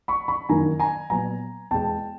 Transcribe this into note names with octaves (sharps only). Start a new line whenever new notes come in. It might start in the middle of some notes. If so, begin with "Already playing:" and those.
B5 C#6
B5 C#6
F#2 D#3 F#3 A#3 G#5 A#5
G#5 A#5
A#2 F#3 B3 G#5 A#5
E2 B2 G#3 B3 G5 A5